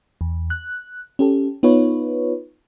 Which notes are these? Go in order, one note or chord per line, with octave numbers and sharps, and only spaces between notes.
E2
F#6
C#4 G4 A4
B3 D#4 F4 B4 C#5